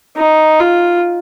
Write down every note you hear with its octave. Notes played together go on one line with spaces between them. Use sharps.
D#4
F4